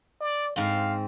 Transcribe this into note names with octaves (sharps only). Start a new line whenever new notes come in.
D5
G#2 C4 F5